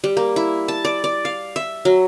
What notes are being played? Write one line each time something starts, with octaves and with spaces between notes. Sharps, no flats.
G3
A#3
E4
A5
D5
D5
F5
E5
F#3